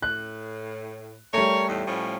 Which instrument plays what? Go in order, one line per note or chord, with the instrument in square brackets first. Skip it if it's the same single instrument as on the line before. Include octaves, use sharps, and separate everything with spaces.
[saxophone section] A2 [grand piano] F#6
[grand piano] G3 A3 [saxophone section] A#4 C#5
[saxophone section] E2 A2 D#4
A2 F3 C#4